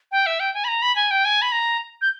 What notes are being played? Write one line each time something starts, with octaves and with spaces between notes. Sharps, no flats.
G5
E5
G5
G#5
B5
A#5
B5
G#5
G5
G#5
B5
A#5
G6